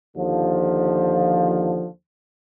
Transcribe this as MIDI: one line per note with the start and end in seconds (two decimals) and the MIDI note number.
0.16 1.87 39
0.16 1.87 50
0.16 1.87 53